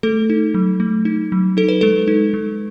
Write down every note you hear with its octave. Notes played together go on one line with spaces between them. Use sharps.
A3 A4
D#4
F#3
A3
D#4
F#3
D#4 A4
B4
G#3 A4
D#4
G#3